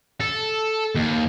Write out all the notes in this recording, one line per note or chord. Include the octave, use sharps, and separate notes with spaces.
A4
D#2